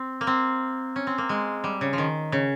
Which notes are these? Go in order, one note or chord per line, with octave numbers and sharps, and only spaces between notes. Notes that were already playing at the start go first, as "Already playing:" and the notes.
Already playing: C4
A#3
C4
C#4
C4
A#3
G#3
G3
C#3
F3
D#3
C#3